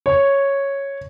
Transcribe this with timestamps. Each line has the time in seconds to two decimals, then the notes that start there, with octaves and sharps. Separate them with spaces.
0.06 C#5